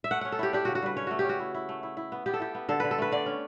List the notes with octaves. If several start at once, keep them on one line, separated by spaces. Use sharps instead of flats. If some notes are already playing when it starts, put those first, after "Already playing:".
E5
A3 F#5
C#4 F#5
A4
E4 G4
D4 G4
C#3 F#4
F#4
G3 B4
C#4 C#5
A3 F#4
G4
C#4 F#4
E4
E4
A3
E4
E4
B3
B3 G4
A4
E4 G4
B3
D3 A4
D3 B4
A4
A3 B4
D3 D5
C#4